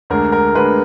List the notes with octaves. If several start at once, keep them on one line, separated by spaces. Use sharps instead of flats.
D2 D3 G#3 A#4
A#4
D2 D3 G#3 B4